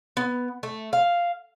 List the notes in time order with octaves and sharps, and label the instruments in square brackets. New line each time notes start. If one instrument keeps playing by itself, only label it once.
[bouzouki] B3
A3
F5